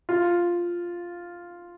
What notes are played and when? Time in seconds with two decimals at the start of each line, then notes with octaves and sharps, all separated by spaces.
0.09 F4